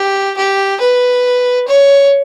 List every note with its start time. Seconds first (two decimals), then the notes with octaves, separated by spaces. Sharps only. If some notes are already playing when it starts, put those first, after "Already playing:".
Already playing: G4
0.37 G4
0.80 B4
1.68 C#5